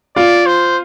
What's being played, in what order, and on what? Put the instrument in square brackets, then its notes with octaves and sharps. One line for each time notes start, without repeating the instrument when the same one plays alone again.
[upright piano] F4 [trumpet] D5
[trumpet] C5